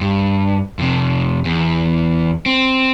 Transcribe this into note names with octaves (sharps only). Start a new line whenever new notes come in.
G2
F2 C3
E2
C4